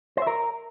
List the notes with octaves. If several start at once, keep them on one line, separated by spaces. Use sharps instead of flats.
C5
E5
A#4